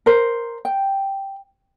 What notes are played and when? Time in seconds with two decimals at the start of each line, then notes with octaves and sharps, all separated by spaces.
0.06 A#4 C5
0.65 G5